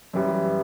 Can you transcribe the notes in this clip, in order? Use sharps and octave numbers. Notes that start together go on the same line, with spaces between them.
F#2 E3 G3